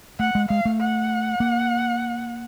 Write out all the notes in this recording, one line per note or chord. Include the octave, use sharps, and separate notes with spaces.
A3 F#5
G#3
G#3 F5
A3
F#5
A#3